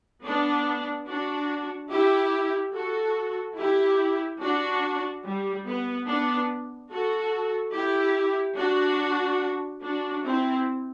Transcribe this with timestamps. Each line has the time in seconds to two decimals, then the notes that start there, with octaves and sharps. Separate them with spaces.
0.24 B3 D4
1.07 D4 F#4
1.91 E4 G4
2.74 F#4 A4
3.57 E4 G4
4.41 D4 F#4
5.24 G3
5.66 B3
6.08 B3 D4
6.91 F#4 A4
7.74 E4 G4
8.58 D4 F#4
9.83 D4 F#4
10.25 C4 E4